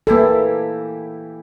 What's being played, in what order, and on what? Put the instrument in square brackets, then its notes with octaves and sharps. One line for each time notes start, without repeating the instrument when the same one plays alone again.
[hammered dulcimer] E3 E4 G4 [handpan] A#3 A4